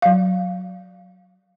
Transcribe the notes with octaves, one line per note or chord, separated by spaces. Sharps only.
F#3 F5